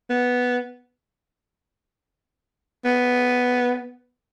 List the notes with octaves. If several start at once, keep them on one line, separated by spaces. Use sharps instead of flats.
B3
B3